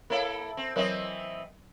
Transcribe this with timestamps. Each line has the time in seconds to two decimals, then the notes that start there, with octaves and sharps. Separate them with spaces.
0.10 A#3 E4 A4 A#4 C#5 F5
0.57 C4
0.76 E3 F#3 C4 A#4 C#5 D#5